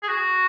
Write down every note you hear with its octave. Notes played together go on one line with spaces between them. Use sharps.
G#4
F#4